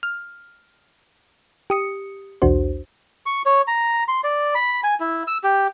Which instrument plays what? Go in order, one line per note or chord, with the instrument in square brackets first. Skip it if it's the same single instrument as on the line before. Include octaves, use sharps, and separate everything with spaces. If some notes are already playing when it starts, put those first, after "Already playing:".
[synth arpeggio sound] F6
G4 D#6 C#7
B1 E2 D4 F#4 C5
[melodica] C#6
C#5
A#5
C6
D5
B5
G#5
E4
E6
G4